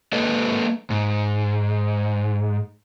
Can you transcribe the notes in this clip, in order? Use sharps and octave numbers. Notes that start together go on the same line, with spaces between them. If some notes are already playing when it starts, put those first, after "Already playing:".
G#3 A#3 A4 B4 D#5
G#2